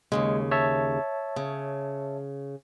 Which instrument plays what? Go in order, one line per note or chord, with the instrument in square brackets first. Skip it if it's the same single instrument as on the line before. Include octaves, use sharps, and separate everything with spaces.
[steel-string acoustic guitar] D#2 A#2 C#3 [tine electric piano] G#3
[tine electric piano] C#5 E5 A5
[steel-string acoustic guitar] C#3